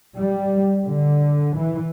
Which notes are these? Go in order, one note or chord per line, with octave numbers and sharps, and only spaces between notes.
G3
D3
E3